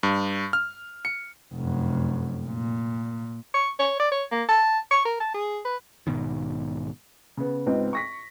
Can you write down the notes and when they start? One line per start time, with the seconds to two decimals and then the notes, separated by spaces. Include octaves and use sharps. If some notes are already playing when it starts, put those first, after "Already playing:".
0.03 G2
0.53 F6
1.05 C#7
1.54 F1 F#2
2.45 A#2
3.54 C#6
3.79 C#5
3.99 D5
4.12 C#5
4.32 A#3
4.49 A5
4.91 C#6
5.05 A#4
5.20 A5
5.34 G#4
5.65 B4
6.07 B1 G#2 B2 D#3
7.37 C#3 B3
7.66 C#2 G#2 B3 C4
7.93 C#6 A#6 B6